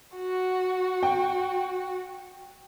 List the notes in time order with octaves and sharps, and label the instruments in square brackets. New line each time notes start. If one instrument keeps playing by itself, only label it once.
[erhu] F#4
[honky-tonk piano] G5